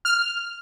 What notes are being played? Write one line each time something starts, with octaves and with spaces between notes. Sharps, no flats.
F6